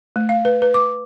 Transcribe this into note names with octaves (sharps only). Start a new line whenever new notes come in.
A3
F5
B4
B4
D6